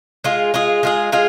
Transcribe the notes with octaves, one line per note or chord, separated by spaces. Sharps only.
G#3 F4 G#4
G#3 F4 G#4
G#3 F4 G#4
G#3 F4 G#4